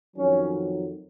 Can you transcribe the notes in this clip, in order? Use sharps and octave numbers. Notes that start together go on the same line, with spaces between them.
F2 D#3 F#3 C#4